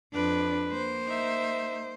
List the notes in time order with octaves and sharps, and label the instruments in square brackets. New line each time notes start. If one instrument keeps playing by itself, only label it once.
[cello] F2 D4 [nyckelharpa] B4
[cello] A#3 C5
[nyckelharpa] D#4 E5